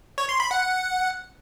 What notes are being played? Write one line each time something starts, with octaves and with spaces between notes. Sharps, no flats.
C#5
C6
B5
F#5